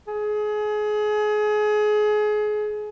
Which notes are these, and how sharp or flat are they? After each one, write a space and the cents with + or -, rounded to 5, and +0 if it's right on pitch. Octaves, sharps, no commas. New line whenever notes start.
G#4 +25